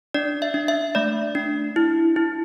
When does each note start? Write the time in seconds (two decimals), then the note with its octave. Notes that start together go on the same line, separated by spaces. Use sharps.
0.14 D4 D5
0.42 E5
0.54 D4
0.68 E5
0.95 A3 D5
1.35 D4
1.76 E4
2.16 E4